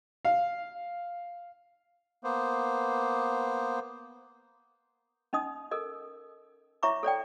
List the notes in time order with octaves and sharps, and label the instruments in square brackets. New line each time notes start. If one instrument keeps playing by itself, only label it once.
[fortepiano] F5
[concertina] A#3 B3 C5
[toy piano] C#4 D#4 D#5 D#6
A4 A#4 D#5
E4 C#5 E5 A#5 C#6 D6
A4 C#5 D5 G5